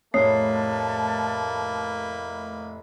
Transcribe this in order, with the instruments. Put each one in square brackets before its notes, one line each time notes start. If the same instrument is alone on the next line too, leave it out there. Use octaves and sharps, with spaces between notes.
[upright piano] F1 A2 [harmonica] A#3 B4 [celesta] C#5 D#6 C7 [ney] A5